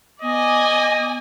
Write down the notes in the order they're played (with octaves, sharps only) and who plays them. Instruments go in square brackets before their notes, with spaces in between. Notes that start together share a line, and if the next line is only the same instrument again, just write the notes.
[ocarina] B3 [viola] D5 G#5 [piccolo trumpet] D#5